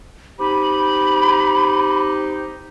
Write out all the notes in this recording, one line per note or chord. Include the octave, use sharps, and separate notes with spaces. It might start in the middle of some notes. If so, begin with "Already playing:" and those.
C4 D#4 G4 B5